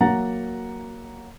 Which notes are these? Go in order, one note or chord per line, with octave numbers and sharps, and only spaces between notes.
F#3 A#3 F#4 F#5 A#5 A6